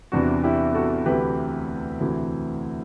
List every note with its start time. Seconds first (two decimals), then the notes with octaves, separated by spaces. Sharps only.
0.12 E2 C3 E3 D4 F#4
0.44 E4 G4
0.74 F#4 A4
1.06 D2 C3 E3 G4 B4
2.00 D2 C3 E3